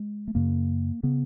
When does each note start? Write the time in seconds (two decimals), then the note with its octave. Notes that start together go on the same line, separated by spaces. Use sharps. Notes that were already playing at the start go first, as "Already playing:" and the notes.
Already playing: G#3
0.28 A3
0.35 F#2 C#3 A#3
1.03 C#3 B3